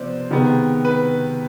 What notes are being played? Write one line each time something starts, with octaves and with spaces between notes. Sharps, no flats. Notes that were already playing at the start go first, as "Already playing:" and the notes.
Already playing: C3 F3 B3 C5 D5
C3 D#3 G#3 B3
B4